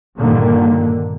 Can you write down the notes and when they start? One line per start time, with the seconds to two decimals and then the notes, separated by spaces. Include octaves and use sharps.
0.17 G2 A#2 D3 D#3 A#3